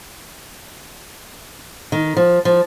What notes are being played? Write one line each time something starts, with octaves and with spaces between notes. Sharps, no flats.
D#3
F3
F3